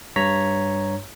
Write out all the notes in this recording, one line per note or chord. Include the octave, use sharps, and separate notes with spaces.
G2 C#5 A#5 B6